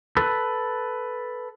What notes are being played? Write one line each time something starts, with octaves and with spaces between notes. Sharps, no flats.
A4 B4